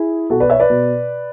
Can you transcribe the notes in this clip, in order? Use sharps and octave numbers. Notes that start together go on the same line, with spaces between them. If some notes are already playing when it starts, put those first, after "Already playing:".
Already playing: E4 G#4
B2 F#4 A4
B4 D5
C#5 E5
B4 D5
B2